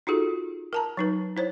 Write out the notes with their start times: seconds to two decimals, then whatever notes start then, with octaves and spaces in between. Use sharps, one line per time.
0.07 D#4 F4 F#4 G#4 A4
0.73 A#4 A5 A#5
0.97 F#3 D#4 B4
1.37 E4 C5 C#5